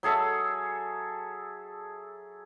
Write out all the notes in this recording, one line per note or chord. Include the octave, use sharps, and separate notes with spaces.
F#3 G#4 A4 E5